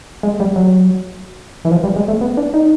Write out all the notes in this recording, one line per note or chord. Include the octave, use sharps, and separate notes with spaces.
G#3
G3
F#3
E3
F3
G3
G#3
A3
B3
D4
D#4